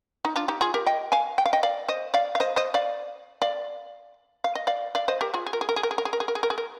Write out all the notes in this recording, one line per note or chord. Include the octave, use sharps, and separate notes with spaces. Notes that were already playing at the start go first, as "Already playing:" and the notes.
D#4
D4 F4
D#4 G4
F4 G#4
G4 A#4
D#5 G5
F5 G#5
G5
F5
D#5 G5
D5 F5
C5 D#5
D5 F5
F5
C5 D#5
C5 D#5
D5 F5
D5 F5
F5
D#5
D5 F5
D5 F5
C5 D#5
G4 A#4
F4 G#4
G#4
A#4
G#4
A#4
G#4
A#4
G#4
A#4
G#4
A#4
G#4
A#4
G#4
A#4
G#4
A#4